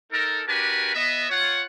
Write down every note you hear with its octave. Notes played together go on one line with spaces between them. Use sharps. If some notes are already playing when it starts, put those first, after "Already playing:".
D#4 A4 A#4
D4 F#4 G4 A#4 B4 G#5
B3 D#5 E5
F4 C#5 F#5